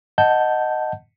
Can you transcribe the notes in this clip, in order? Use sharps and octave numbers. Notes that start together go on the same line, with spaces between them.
D#5 F#5 A5 G6